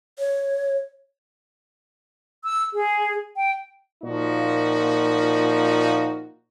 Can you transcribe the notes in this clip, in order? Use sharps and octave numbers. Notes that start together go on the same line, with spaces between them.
C#5
E6
G#4
G5
A#2 F3 A#3 D#4 F#4